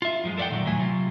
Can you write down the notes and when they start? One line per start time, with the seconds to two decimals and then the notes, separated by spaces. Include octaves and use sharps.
0.02 F4 E5
0.24 F#2 F3 G#3
0.38 A4 A#4 D5 E5 F#5 G5
0.50 A#2 D#3 E3 F#3
0.65 D2 A2 F#3 A3 G#5
0.77 C3 F#3 F4